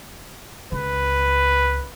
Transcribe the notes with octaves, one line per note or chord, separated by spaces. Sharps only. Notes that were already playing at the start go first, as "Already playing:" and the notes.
C#2 B4